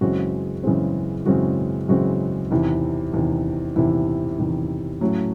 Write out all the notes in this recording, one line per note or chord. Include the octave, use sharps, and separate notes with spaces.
F#2 C#3 E3 G#3 C4 F#4
F#2 C#3 E3 G#3 C4
F#2 C#3 E3 G#3 C4 F#4
F#2 C#3 E3 G#3 C4 F#4
E2 C3 D#3 E4
E2 C3 D#3
E2 C3 D#3 E4
E2 C3 D#3
A2 F#3 A3 C#4